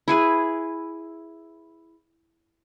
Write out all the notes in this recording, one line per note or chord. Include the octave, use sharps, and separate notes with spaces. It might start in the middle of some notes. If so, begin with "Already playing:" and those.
E4 G#4 B4